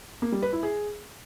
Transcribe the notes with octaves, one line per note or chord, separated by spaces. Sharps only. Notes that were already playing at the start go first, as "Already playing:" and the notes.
A#3
G3
B4
E4
G#4